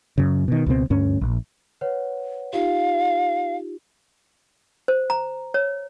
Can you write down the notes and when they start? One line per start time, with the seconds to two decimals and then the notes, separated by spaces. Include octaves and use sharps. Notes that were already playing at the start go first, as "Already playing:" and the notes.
0.18 F#2 C#3
0.48 B2 D#3
0.66 C#2 B2 C4
0.90 D2 G2 C#4
1.21 A#1
1.81 B4 C#5 F#5
2.53 D#4 F4 G4 F5
4.88 C5
5.10 A#5
5.54 C#5